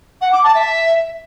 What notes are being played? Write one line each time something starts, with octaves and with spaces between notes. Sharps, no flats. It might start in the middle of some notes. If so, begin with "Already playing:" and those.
F#5
D6
A5
E5